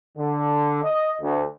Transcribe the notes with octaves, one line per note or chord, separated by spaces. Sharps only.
D3
D#5
D2